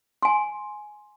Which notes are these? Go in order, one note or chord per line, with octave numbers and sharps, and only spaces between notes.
G#5 C6